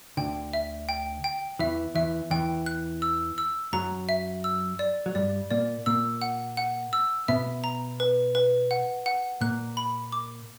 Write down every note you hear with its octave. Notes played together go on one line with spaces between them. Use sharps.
D2 D3 G5
E5
G5
G5
E2 E3 E5
E2 E3 E5
E2 E3 G5
F#6
E6
E6
F#2 F#3 A#5
E5
E6
D5
F#3
G2 G3 D5
A#2 A#3 D5
A#2 A#3 E6
F#5
F#5
E6
B2 B3 E5
A#5
B4
B4
F#5
F#5
A#2 A#3 F#6
B5
D6